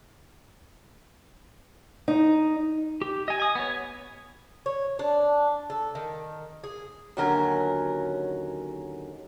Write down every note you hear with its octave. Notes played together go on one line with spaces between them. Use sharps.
D#4
G4
D#5 G#5
G#5 D#6
B3 C#5
C#5
D4
A4
D#3
G#4
D#2 D3 F#3 C#4 A#4